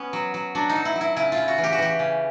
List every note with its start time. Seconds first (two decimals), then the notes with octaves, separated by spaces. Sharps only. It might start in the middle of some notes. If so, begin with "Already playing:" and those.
Already playing: B3 C#4
0.13 F#3
0.34 F#3
0.55 F#3 D4
0.69 D#4
0.76 F#3
0.85 E4
0.95 F#3
1.01 E4
1.16 C#3 E4
1.32 F4
1.37 C#3
1.48 F#4
1.58 E3
1.64 G4
1.72 F#4
1.79 E3 G4
1.99 C#3